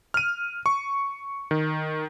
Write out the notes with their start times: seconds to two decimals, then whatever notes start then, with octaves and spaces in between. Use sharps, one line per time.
0.14 F6 D#7
0.66 C#6
1.51 D#3